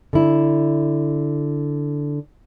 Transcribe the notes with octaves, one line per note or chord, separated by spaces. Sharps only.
D3 E4